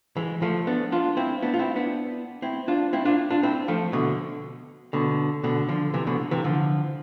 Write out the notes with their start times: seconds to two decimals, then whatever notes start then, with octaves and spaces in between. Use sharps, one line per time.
0.17 E3 G#3
0.42 F3 A3
0.67 B3 D4
0.92 D4 F4
1.17 C4 E4
1.42 B3 D4
1.54 F4
1.59 C4 E4
1.76 B3 D4
2.42 C4 E4
2.68 D4 F4
2.93 C4 E4
3.05 D4 F4
3.30 D4 F4
3.43 C4 E4
3.68 F3 A3
3.93 B2 D3
4.93 B2 D3
5.44 B2 D3
5.69 D3 F3
5.94 C3 E3
6.07 B2 D3
6.31 C3 E3
6.44 D3 F3